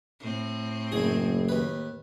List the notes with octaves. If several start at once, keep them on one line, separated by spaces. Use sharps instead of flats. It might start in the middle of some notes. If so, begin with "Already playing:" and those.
A2 C4
F#1 E4 G#4
D#2 B4